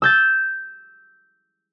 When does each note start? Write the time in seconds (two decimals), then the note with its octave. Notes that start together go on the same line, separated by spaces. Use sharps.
0.02 E6 G6 A6